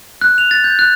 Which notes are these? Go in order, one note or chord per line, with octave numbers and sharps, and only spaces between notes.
F#6
F7
A6
G6
F#6